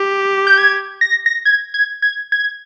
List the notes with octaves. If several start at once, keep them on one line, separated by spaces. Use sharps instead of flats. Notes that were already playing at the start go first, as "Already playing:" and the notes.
Already playing: G4
G6
G#6
A#6
A#6
G#6
G#6
G#6
G#6